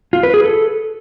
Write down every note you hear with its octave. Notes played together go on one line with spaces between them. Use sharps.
F4
B4
G#4
A4